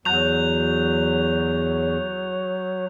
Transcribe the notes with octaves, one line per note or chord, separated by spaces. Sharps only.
E2 F#3 F#6 G6 F7